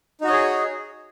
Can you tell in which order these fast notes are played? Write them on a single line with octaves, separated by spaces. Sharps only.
D#4 F#4 D#5 C#5 G#4